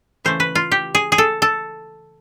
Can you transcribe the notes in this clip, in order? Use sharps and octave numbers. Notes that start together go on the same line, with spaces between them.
C#3 E3 A3 C5
B4
F4
G4
G#4
G#4
A4
A4